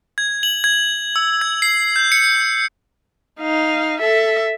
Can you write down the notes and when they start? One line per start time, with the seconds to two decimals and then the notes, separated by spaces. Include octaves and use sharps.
0.18 G#6
0.43 F#7
0.64 G#6
1.16 E6
1.41 G#6
1.62 C7
1.96 G6
2.12 C#7
3.41 D#4 F5
4.00 A4 E5